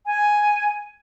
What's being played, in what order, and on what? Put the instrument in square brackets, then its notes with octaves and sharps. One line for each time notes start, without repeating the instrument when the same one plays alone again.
[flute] G#5